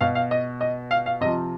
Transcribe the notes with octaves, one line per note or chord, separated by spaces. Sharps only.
B2 F5
F5
D#5
D#5
F5
F5
C3 F3 D#5